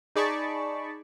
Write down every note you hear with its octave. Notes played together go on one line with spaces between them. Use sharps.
D#4 G#4 D5 A5 B5 C#6